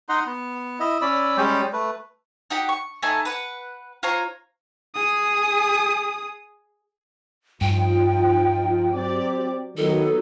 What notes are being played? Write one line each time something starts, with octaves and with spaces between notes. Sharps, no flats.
D#4 D#5 F#5 C6
B3
E4 D#5
C#4 D5 B5 E6
G3 G#3 C#4 G5
A3 B4
D#4 F#4 G4 G5
C#6
A3 D#4 G#5 A5
B4 F#5
F4 C5 C#5 A#5
G#4 D#6
G2 F3 D#4 G5
F#3 C4 G4 D5
D#3 F#3 B3 D#4 A4